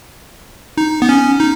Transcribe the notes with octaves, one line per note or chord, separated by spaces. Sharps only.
D#4
B3
C#4
D#4